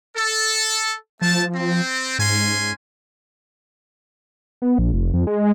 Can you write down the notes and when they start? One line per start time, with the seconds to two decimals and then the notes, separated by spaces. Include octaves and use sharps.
0.16 A4
1.21 F3 A3 A5
1.55 C4
2.19 G#2 C#4 G#5 C6
4.62 B3
4.79 A#1
4.93 F1
5.14 F2
5.27 G#3